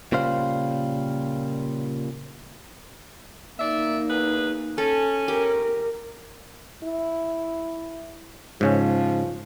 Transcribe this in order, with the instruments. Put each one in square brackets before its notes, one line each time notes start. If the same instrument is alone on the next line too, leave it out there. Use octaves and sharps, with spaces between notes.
[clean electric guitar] A#2 C#3 G3 C5 F5
[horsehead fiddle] A#3 D#4 [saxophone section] D5 E5
[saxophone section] E2 G#4 B4
[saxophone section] C#4 [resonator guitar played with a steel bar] A4
[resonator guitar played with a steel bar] G4 [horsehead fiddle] A#4
[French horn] E4
[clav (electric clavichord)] G#2 C#3 C#4 [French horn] F3